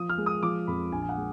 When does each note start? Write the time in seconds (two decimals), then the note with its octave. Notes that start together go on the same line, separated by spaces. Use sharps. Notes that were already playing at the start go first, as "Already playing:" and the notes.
Already playing: F3 D#6
0.09 F6
0.18 G#3
0.26 D#6
0.43 F3 D6
0.67 F2 B5
0.92 A#1 G#5
1.02 G#5
1.09 F#5
1.17 G#3